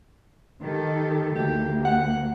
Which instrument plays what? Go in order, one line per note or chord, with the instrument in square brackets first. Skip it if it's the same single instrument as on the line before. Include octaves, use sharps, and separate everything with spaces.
[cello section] D#3 G4 A4
[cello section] D2 A#3 [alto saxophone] G4
[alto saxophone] F#5